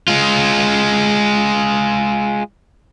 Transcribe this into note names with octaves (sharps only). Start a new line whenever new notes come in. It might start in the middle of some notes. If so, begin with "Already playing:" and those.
G#3 F4